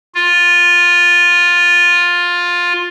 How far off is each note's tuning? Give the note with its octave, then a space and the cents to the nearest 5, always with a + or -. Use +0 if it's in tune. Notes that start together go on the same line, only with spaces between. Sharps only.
F4 +10